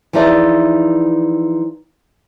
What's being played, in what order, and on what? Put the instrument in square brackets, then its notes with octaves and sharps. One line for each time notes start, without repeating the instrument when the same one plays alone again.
[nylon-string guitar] E3 F3 D#4 E4 G#4 D5